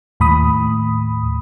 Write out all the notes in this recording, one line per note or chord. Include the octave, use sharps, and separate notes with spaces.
D#2 A2 B5 D#6